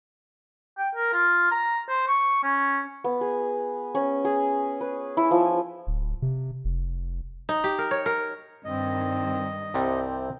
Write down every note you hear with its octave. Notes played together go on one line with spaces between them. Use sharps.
G5
A#4
F4
A#5
C5
C#6
C#4
B3
G#4
C#4
G#4
B4
E4
F3
D1
C3
F1
D#4
G4
A#4
C#5
A#4
G2 D#3 C4 D#5
C2 C3 G3 C4